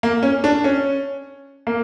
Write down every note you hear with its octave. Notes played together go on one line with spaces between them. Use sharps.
A#3
C#4
D4
C#4
A#3